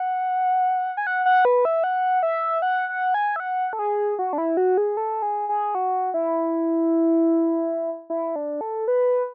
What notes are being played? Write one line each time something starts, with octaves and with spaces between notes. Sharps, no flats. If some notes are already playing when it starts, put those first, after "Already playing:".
Already playing: F#5
G#5
F#5
F#5
B4
E5
F#5
E5
F#5
F#5
G#5
E5
F#5
A4
G#4
F#4
D4
E4
F#4
G#4
A4
G#4
G#4
F#4
E4
E4
D4
A4
B4